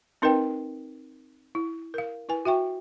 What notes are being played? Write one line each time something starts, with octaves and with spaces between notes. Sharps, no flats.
C4 D#4 A#4 B4 D#5 G5
E4
A#4 F5
E4 B4 G#5
F#4 E5 G5 C#6